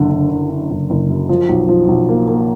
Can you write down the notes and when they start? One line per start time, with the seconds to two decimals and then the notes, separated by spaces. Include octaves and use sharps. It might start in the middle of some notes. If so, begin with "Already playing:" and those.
Already playing: F#1 D3
0.11 D3
0.30 D3
0.50 D3
0.70 F#1
0.90 F#1
1.09 F#2
1.29 F3
1.49 B1
1.69 F3
1.88 B1
2.09 A#3
2.27 A#3